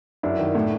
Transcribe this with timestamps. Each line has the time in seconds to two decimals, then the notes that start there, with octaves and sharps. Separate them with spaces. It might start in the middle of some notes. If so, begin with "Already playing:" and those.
0.23 F#2 D4 E4
0.39 D#3
0.55 A2